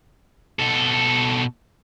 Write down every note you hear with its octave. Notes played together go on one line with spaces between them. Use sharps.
B2 A4